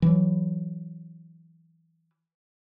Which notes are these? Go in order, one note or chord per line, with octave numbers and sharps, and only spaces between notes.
E3 F#3